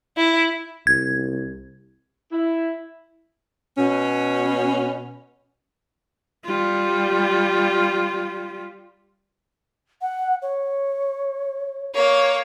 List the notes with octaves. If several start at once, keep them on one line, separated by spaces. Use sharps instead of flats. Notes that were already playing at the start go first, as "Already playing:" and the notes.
E4
C2 G#6
E4
B2 C#4
G3 F4
F#5
C#5
A#3 C#5